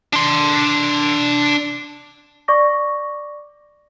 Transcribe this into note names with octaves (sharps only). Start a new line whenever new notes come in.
D4 C6
D5 C#6 D6 A#6